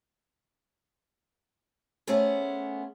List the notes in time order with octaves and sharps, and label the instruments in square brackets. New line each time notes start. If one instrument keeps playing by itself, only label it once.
[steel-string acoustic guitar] A3 B3 C#4 G#4 C5